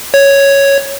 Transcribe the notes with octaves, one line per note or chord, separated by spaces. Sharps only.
C#5